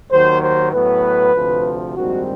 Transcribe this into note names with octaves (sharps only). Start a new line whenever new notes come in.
D#2 D#3 F#3 C5
C5
A2 F#3 B3 B4
D2 C3 F3
A#1 G#2 D#3 G3 C4 F#4